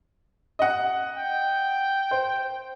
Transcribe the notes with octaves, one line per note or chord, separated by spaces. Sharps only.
D#5 F#5
G5
C5